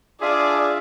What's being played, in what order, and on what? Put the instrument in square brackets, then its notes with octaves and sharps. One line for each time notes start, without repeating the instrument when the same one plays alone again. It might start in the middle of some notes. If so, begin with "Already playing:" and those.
[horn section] D4 G#4 [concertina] F4 E5 [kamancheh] D5